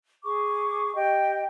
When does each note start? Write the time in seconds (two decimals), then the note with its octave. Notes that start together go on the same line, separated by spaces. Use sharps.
0.23 G#4 C#6 D6
0.95 G4 D#5 G5